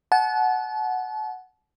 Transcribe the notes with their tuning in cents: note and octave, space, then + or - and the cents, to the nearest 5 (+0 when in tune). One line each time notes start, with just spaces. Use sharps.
F#5 +0 A5 -35